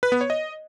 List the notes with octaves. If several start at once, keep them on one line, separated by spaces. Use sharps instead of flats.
B4
B3
C#5
D#5